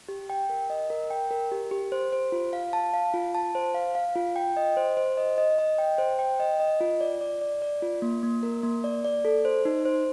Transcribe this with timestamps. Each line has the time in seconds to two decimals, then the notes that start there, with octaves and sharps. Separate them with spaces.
0.09 G4
0.30 G5
0.50 A#4
0.70 D#5
0.90 A#4
1.10 G5
1.31 A#4
1.52 G4
1.71 G4
1.92 C5
2.13 C5
2.32 F4
2.53 F5
2.73 A5
2.94 F5
3.14 F4
3.35 A5
3.55 C5
3.74 F5
3.95 F5
4.16 F4
4.36 G5
4.57 D#5
4.77 C5
4.97 C5
5.17 D#5
5.38 D#5
5.58 D#5
5.78 G5
5.98 C5
6.19 G5
6.40 D#5
6.60 D#5
6.80 F4
7.01 D5
7.21 D5
7.42 D5
7.62 D5
7.82 F4
8.02 A#3
8.23 A#3
8.43 A#4
8.63 A#3
8.84 D5
9.05 D5
9.25 A4
9.45 C5
9.65 D#4
9.85 C5